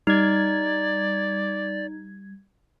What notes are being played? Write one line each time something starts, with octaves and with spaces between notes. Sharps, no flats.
G3 D#4 D5 G#6